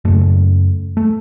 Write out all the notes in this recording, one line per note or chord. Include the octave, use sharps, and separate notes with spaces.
F#2 C#3 A3
A3